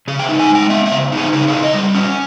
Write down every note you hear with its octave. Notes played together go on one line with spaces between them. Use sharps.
C#3 G#4
G5
D#4 E5
G#5
G#3
G5
B3 E5
E5
C#3
D#4
G#4
C#3 B4
A#4
E4 G#4
D#5
G3
C#4